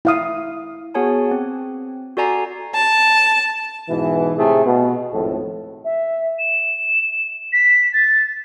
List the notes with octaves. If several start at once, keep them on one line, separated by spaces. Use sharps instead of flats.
E4 F5 D#6
B3 F#4 G#4 C#5 G#5 A5
C4
F#4 A4 D5 G#5 A#5 C7
A5
G#2 B2 E3
A2 C3 A3 G#4
B2
G#1 F2 A2 A4
E5
E7
B6
A6